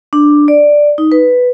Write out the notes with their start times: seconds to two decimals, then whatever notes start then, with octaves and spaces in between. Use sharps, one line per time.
0.13 D4
0.48 D5
0.98 D#4
1.12 B4